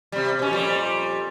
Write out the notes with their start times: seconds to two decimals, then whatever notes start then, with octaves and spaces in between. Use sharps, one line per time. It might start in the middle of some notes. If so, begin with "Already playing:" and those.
0.12 C3 G3
0.39 B2 C#4
0.51 F2 A#2 G3